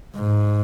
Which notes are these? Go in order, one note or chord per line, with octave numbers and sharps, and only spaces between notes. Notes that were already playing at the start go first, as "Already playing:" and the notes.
G#2